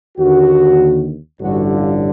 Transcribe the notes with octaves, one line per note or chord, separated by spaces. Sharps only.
D#2 D3 F#4
A1 G2 D3 F#4
F4